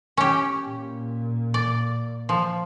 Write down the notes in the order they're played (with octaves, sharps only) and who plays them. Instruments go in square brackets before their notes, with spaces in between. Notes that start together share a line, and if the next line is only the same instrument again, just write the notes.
[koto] C#4 G4
[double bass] A#2
[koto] D5
F3